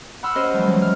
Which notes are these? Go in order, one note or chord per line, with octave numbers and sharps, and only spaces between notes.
F#5 B5 C6 E6 F6
C#4 G4 C5 D#5
E3 F3 G3 A3 D#4
E3 F#3 G#3
F6